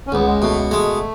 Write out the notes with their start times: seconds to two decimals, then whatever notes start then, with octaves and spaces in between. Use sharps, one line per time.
0.07 C#4
0.12 C#2 B3
0.27 G#3
0.42 B2 A3
0.71 G#3 A3